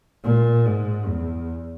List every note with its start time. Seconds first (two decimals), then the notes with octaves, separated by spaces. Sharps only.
0.24 A#2
0.66 G#2
1.08 E2